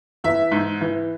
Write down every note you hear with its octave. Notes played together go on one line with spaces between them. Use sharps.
E3 E5
G#2
E3